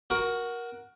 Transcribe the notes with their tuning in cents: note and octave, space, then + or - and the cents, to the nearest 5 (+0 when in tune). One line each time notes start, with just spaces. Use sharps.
F#4 +0 A#4 +15